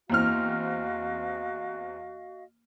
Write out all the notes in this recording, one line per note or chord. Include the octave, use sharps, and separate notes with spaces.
E2 A#3 C4 E4 F#4 D#5 F5 F6